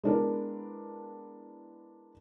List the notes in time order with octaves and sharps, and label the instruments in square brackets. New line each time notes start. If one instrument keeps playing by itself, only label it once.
[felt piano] G#3 B3 D4 E4 A#4